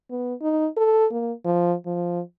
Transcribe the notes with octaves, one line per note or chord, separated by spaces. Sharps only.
B3
D#4
A4
A#3
F3
F3